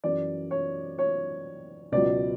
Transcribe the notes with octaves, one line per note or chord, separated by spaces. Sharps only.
F#2 E3 D5
C#5
C#5
C#2 B2 F#3 D5